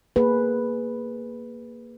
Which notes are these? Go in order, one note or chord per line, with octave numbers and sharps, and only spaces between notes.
A#3 G#4 B4